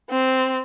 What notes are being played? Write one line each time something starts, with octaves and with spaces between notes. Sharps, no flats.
C4